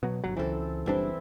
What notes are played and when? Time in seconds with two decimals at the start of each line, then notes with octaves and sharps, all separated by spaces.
0.03 B2 F#3
0.24 G1 C2 F#3
0.37 C#2 E3 C4 A4
0.86 F#1 E3 G3 C4 D4 E4